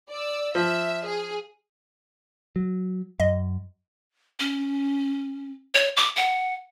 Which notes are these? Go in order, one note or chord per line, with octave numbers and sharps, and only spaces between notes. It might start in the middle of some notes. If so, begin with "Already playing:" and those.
D5 E6
F3 E5
G#4
F#3
F#2 D#5
C#4
C#5
D6
F#5